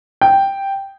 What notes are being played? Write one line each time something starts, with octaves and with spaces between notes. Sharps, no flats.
G5